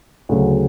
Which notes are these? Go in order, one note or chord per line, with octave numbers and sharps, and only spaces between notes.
D2 C#3 F#3